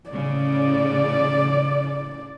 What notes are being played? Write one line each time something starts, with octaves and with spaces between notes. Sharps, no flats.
A2 C#3 D5